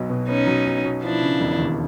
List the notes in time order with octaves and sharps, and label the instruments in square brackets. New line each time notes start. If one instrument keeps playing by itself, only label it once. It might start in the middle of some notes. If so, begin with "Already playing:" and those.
Already playing: [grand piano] B1 F#3 B3
B2
[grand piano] B3 [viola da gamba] C#4 D#4
[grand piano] F#3
B1
B2
[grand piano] F3 [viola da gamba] D4 E4
[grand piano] C#3
E1
D#2